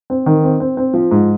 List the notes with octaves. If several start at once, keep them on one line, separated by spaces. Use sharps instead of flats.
C4
D#3
C4
C4
C4
F3
G#2